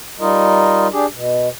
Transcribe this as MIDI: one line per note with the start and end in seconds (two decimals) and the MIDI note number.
0.20 0.87 55
0.20 0.87 63
0.20 0.87 65
0.20 0.87 70
0.20 0.87 75
0.92 1.06 62
0.92 1.06 67
0.92 1.06 68
1.13 1.48 47